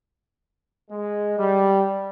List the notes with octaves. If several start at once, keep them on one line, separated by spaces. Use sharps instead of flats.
G#3
G3